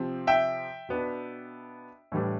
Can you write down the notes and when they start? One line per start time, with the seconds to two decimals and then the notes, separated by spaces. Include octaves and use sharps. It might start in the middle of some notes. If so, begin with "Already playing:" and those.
Already playing: C3 F3 C4
0.27 E5 G5
0.89 B2 B3 D4
2.12 A2 E3 G3 D4